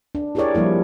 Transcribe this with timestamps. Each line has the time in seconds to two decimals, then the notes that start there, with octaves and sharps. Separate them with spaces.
0.15 D4
0.35 E4 G4 G#4 A#4 C#5 D5
0.55 F3 G3 A#3 E4